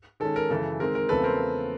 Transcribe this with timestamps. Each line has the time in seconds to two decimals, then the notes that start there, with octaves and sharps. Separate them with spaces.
0.20 D#3 G#3 C#4 A4
0.36 A#4
0.50 F#2 C#3 E3 A4
0.80 D#3 G#3 C4 A#4
0.95 A#4
1.09 E2 C#3 F3 A3 C4 A4 B4
1.24 A#4 C5